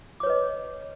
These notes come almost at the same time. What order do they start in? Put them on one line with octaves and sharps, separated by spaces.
D6 C#5 B4 D#5